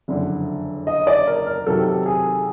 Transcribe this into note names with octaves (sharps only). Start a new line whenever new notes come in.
F#1 F2 D3
D#5
D5
A#4
A#4
C3 D#3 F#3 A4
G#4